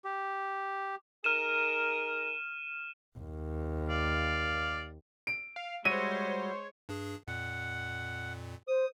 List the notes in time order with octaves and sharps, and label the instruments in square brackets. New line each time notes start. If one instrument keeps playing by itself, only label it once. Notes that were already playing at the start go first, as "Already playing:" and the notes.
[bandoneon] G4
[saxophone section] D#4 G#4 A#4 [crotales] F6 D#7 E7
[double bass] D#2
[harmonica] D5 F5
[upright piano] D7
[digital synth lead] F5
[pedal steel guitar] G3 F#4 E5 [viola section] G#3 C5 [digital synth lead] C#5 [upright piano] D#7
[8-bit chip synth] G2 D4 G#4
[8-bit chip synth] F2 A#2 [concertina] F#5
[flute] C5 [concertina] D#6